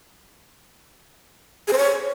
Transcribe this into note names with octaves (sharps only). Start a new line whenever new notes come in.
G#4
C5
C#5